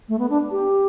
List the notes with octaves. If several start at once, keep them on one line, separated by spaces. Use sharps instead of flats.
A3
B3
D4
G4